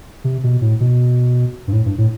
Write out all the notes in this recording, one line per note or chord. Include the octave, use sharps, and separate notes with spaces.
C3
B2
A2
B2
G2
A2
G2
A2